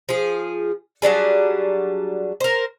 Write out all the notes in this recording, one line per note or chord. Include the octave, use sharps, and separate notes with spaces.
F3 G#4
F#3 G3 D4 G#4
A#4 C5